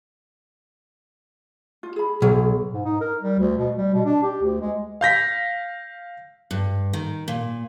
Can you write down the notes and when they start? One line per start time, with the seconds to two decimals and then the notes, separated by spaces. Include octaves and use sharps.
1.83 F4
1.96 G#4 B5
2.22 B1 G#4 C#5
2.73 G#2
2.85 D#4
3.01 A#4
3.22 G3
3.39 D2
3.58 B2
3.76 G3
3.94 B2
4.05 D4
4.23 G4
4.43 D2
4.61 G#3
5.01 F5 G6 A#6 B6
6.51 G2
6.93 D#3
7.28 A#2